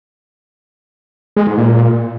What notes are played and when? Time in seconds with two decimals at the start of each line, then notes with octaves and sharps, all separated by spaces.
1.37 G#3
1.47 G#2
1.58 A#2